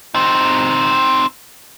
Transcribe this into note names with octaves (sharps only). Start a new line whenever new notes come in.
C4 D#4